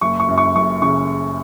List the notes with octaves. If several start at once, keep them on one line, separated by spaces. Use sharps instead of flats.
F#1 C#6
C#6
F#2
C#6
F#1 C#6
C#3 C#6